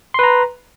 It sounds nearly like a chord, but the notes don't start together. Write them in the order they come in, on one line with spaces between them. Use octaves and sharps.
C6 B4 A#5